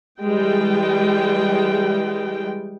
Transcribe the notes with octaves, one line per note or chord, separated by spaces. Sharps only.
E3 G3 G#3 G5